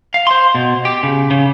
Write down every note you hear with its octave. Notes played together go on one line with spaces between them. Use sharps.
F5
C5 C6
B2
G4
C#3
C#3